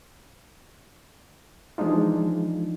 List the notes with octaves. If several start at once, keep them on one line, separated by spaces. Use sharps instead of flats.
E3 F3 G#3 D4 D#4 F4